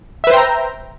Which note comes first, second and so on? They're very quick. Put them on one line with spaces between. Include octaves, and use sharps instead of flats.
E5 B4 C5 G5 A#5